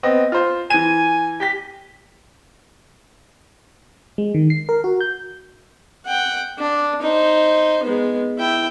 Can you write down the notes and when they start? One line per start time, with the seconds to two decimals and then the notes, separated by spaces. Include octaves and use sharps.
0.03 B3 C4 D#5
0.32 F4 C5
0.70 E3 G#5 D#7
1.40 G4 G5 B6
4.18 G#3
4.34 D#3
4.50 C7
4.69 A#4
4.84 F#4
5.01 G6
6.06 F#5 G5
6.58 D4
7.02 D#4 C5
7.83 G#3 B3
8.38 E4 G5